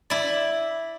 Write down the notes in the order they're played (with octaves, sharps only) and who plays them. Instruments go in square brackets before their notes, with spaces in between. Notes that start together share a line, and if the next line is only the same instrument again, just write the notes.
[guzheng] E4 D5